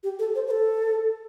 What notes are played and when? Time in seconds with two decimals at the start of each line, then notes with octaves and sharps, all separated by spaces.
0.03 G4
0.19 A4
0.35 C5
0.47 C5
0.51 A4